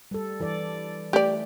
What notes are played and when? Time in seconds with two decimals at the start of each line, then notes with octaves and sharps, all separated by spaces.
0.11 G3 A4
0.40 E3 A4 D5
1.13 A3 G4 D5